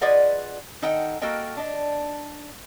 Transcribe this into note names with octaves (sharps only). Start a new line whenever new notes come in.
F4 G#4 B4 D5 D#5 F#5
D#3 D#4 A4 D#5 F#5 G5
A#3 F#4 A4 A#4 D#5 G5
D4 D#5